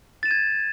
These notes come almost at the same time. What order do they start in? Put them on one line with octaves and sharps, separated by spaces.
A6 E7 D#7 G#6